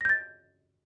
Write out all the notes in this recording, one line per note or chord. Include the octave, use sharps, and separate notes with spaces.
G6 A6 A#6